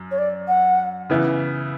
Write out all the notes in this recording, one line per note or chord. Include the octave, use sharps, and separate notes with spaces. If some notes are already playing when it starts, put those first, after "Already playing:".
Already playing: F#2
C#5
D5
F#5
C#3 E3 B3 E4